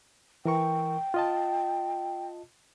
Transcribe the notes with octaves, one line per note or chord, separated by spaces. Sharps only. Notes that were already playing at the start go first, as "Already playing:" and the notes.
E3 A#4 G5 C#6
F4 D#5 A5